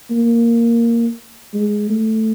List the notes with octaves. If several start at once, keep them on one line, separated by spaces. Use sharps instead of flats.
A#3
G#3
A3